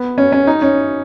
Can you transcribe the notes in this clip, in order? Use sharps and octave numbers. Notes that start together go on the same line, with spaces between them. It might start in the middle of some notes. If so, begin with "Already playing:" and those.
Already playing: B3
C#4
C#4
D#4
C#4